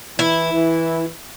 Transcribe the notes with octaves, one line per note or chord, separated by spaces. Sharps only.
E3 E4
E3